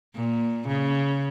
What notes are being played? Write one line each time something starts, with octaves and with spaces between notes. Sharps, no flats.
A#2
C#3